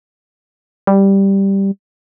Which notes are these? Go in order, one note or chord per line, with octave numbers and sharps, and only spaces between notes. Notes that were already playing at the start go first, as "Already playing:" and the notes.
G3